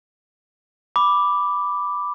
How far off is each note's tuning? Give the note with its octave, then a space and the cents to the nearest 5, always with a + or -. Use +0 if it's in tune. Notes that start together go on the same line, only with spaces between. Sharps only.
B5 +0 D6 +0